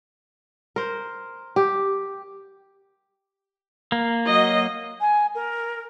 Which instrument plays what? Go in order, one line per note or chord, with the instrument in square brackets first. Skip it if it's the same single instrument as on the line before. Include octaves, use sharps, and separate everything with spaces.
[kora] A#4 C5
G4
[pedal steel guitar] A#3
[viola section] F#3 D#5
[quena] G#5
A#4